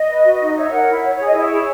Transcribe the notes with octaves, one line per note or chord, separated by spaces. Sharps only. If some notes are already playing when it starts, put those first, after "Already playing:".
Already playing: D#5
B4
F#4
D#4
C#5 E5
A#4 F#5
E4
C#5
G#4 C#5
D#5
E4 C#5
G#4